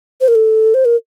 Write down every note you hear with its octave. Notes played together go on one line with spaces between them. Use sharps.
C5
A#4
A4
C5
A#4